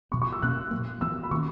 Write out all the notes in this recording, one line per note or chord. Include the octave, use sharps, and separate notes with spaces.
B2 F#3 B3 C#6
C#6
E6
B2 A#3 C#4 F#6
A#2 F#3 A#3
E3 B3 E6
B5
D#3 A#3 C#4 C#6